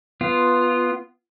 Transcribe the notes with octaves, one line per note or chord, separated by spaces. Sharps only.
B3 F4